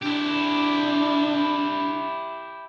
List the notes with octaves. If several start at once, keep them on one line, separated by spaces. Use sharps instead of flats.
D4 E4 G4